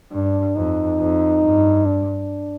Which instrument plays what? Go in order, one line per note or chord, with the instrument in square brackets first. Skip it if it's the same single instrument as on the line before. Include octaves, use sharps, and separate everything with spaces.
[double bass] G2 [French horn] D4
[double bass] F2 [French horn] D#4
[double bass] F2
G2
[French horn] D4